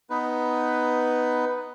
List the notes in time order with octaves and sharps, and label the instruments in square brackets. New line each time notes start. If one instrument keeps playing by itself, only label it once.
[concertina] B3 D#4 B4